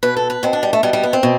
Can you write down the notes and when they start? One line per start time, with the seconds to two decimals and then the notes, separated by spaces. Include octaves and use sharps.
0.03 B2 B4
0.17 A4
0.30 B4
0.43 B2 C4
0.53 D4
0.63 G3
0.73 A3
0.83 B2 G3
0.93 G3
1.03 B3
1.13 C4
1.23 B2